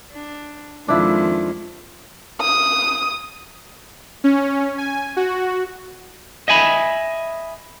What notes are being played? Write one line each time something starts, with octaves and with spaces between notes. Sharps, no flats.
D4
F2 D#3 G#3 D4 E4 F4
D#6
C#4
G#5
F#4
D#5 E5 G#5 B5